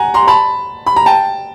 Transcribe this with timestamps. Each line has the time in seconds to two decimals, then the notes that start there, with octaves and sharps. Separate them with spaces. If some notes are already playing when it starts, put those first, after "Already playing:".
Already playing: F#5 G#5 A#5
0.14 A#5 C6
0.28 A5 B5
0.86 B5
0.96 A#5
1.06 G5 A5